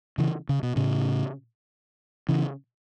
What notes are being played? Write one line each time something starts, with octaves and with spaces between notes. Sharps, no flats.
C#3 E3
C#3
B2
A2 C#3
C#3 E3